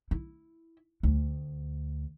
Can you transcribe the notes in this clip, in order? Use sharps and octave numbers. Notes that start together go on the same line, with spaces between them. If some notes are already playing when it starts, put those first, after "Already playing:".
E4
D2